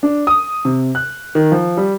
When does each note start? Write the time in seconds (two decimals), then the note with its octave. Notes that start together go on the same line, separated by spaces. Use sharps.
0.03 D4
0.27 D#6
0.65 C3
0.95 F#6
1.35 D#3
1.52 F3
1.77 G3